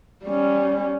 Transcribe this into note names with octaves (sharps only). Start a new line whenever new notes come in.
G3 C#4